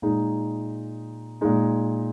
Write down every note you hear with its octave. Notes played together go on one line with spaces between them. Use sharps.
A#2 G#3 D#4
A#2 G#3 D#4